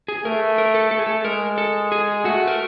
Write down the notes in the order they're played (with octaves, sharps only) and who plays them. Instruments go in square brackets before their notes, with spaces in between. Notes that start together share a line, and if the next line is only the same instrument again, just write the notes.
[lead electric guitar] G#4
[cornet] A3 [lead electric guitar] A#4
[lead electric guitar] A#4
A4
[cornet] A3 [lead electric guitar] A4
[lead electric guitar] G#4
A4
[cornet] G#3 [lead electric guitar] A#4
[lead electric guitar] A4
G#4
[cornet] A3 [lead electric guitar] F#4
[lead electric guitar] A#4